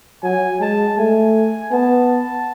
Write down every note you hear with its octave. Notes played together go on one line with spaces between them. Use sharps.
F#3 G#5
G#3 A5
A3 G#5
B3 A5